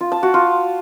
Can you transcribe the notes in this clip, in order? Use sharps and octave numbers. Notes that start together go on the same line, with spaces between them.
F4
A5
F#4
F4